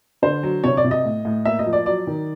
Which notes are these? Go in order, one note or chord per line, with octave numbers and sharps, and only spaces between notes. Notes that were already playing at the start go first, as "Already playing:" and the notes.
D3 C5
F#3
C3 C#5
D5
C3
D#5
A2
A2
A#3 E5
D#5
F3
D5
F#3 D5
D#3